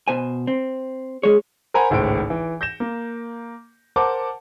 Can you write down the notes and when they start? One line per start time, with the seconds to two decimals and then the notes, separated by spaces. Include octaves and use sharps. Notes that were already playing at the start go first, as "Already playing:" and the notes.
0.08 B2 C5 G#5
0.47 C4
1.23 G#3 G#4 C#5
1.74 A#4 C5 F#5 G#5 A#5 B5
1.90 G#1 C#2 A2 C5 D7
2.30 E3
2.61 G6 A#6 E7
2.80 A#3
3.96 A#4 C5 F#5 A5 D6